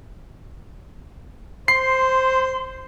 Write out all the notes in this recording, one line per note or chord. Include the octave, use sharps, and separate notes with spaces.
C5 C6 C7